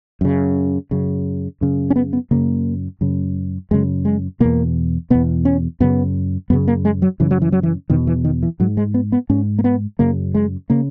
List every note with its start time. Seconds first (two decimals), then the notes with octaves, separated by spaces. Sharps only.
0.21 F#2 C#3
0.91 F#2 C#3
1.61 F#2 C#3
1.90 C#4
1.96 B3
2.13 B3
2.31 F#2 C#3 A#3
3.01 F#2 C#3
3.71 F#2 C#3 G#3
4.05 G#3
4.40 E2 B2 A#3
5.10 E2 B2 B3
5.45 C#4
5.80 F#2 C#3 B3
6.50 F#2 B3
6.53 C#3
6.68 A#3
6.85 G#3
7.02 F#3
7.20 F#2 C#3 E3
7.31 F#3
7.42 E3
7.52 F#3
7.63 E3
7.90 E2 B2 D#3
8.07 E3
8.25 D#3
8.43 E3
8.60 G#2 F#3
8.77 G#3
8.94 B3
9.12 B3
9.30 G#2 C#4
9.59 A#3
9.64 B3
9.99 F#2 C#3 A#3
10.34 G#3
10.70 C#3 A#3